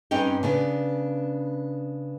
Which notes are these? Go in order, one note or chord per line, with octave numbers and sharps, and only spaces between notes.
G2 C4 C#4 D#4 G5
C#3 B3 D4